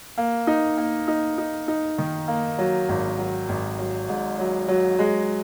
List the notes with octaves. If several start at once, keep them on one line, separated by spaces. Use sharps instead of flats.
A#3
D#4
A#3
D#4
D#4
D#4
D#3
A#3
F#3
G#1
F#3
G#1
F#3
G#2
F#3
F#3
G#3